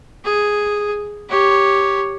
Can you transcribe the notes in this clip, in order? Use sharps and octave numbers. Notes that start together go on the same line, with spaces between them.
G#4
G4 C#5